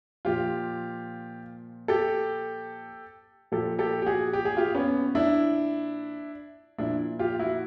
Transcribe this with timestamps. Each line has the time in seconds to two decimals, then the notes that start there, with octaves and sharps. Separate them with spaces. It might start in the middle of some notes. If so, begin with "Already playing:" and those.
0.25 A#2 F3 F4 G4
1.88 G4 A4
3.52 A#2 F3 G4 A4
3.79 G4 A4
4.02 G4
4.06 F#4 G#4
4.33 G4
4.45 G#4
4.57 F4 G4
4.75 B3 C#4
5.15 D4 E4
6.78 A#2 F3 D4 E4
7.19 F4 G4
7.39 E4 F#4